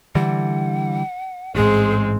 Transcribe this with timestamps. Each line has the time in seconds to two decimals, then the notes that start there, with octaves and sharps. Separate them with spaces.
0.15 D3 E3 G3 F#5
1.55 A1 G#2 G#3 C4 G#4